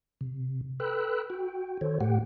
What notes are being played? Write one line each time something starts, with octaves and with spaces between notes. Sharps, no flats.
C3
A4 B4 G5 B5 E6 F#6
F#4 G5
D#3 A4 C5 C#5
A2 A3 G4 F#5 G5